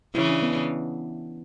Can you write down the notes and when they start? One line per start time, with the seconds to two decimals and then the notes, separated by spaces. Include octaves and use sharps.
0.14 C#3 E3 E4
0.28 D4
0.42 B3